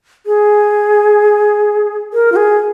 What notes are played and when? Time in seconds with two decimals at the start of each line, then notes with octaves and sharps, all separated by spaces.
0.26 G#4
2.13 A#4
2.32 F4
2.36 G#4